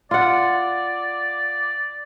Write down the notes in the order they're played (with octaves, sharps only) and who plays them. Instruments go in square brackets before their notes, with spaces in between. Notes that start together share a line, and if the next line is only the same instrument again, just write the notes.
[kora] F4 F#5 [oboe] D5